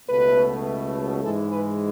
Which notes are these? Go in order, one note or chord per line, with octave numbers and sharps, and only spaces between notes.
C#2 B2 A3 B4
G#2 E3 G#3 A4
B4